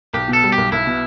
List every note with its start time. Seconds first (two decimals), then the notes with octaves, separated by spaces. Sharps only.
0.14 B1 G4
0.28 B2
0.33 A4
0.43 G3
0.52 G4
0.58 B1
0.72 B1 E4
0.86 B2